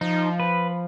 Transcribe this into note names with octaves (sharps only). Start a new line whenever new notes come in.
F3 D#4
B4